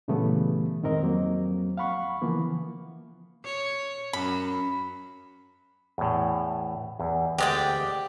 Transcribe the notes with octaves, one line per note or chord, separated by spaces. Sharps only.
A#2 C#3 E3 G3 A3 B3
F2 G#2 D#3 C4 A#4 D#5
F2 F#3 A#3 C4
F5 F#5 B5 C#6
C#3 E3 F3 A#3 B3
C#5
F#2 B5
E2 A2
E2
D2 G#3 G4 D5 G5